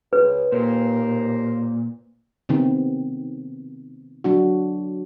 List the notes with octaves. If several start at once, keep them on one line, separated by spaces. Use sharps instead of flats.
C#2 B4
D#2 A#2 A#4 C5
C3 D#3 B3 C4
F#3 D4 F#4